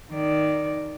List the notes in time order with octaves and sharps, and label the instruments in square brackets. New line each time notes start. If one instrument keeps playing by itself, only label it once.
[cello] D#3 D5